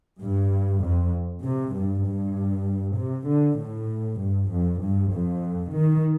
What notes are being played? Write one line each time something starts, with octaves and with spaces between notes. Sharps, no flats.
G2
F2
C3
G2
G2
C3
D3
A2
G2
F2
G2
F2
D#3